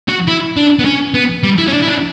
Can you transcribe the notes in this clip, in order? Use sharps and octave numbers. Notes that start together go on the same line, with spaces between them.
F#4
E4
D4
B3
C#4
B3
G3
E4
C#4
D4
E4
D4